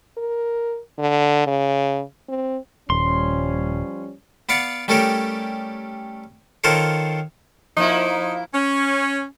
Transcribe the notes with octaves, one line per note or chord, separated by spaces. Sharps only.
A#4
D3
C#3
C4
D#1 F3 G3 C#4 C6
B3 B4 D5 F5 F#5
G3 A3 C#4 G4 A4 A#4
D#3 F4 A4 A#4 C5 C#5
F3 A#3 D#4 E4
C#4